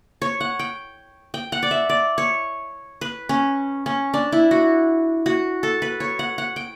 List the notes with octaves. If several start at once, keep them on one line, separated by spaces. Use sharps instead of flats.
C#5
F#5
G5
G5
F#5
D5
E5
D5
C#5
B4
C#4
C#4
D4
E4
F#4
F#4
A4
B4
C#5
F#5
F#5
G5